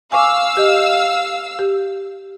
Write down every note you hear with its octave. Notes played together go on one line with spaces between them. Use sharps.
F5 G#5 C#6 D6 E6
G4 D#5
G4